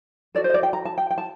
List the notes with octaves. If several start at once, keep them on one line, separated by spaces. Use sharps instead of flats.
F#4 A4 D5
C5
D#5
D5
G5
A#5
A5
G5
G5
A5